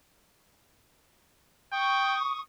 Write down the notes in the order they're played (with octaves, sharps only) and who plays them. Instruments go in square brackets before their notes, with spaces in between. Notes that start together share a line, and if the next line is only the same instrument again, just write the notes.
[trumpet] G5 [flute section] C#6 D#6